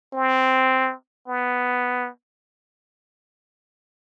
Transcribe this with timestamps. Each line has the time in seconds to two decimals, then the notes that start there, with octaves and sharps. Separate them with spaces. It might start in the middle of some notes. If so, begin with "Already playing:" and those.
0.13 C4
1.28 B3